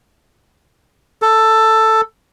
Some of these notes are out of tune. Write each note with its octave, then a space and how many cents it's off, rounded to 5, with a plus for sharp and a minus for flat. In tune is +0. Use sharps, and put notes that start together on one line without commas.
A4 +10